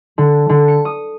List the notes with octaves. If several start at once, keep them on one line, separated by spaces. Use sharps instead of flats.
D3
D3
C#7
D#6